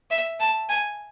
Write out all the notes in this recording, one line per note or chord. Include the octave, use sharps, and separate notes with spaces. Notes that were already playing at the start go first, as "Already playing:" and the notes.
E5
A5
G#5